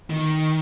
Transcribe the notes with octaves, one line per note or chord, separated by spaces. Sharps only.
D#3